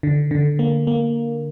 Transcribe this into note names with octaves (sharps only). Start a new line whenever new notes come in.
D3
D3
A#3
A#3